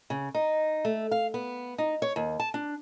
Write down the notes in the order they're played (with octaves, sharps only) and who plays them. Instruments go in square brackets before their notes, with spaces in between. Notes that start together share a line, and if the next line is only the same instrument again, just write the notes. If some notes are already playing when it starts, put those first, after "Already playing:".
[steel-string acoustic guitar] C#3
D#4
A3
F5
B3
D#4
C#5
D#2
A5
D4